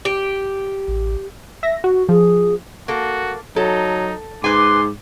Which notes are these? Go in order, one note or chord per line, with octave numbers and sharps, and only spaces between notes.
G4
A1
E5 A#6
F#4
F3 G#4
A#3 F#4 A4
F#3 D#4 A4
G#2 B4 G#5 C6 D6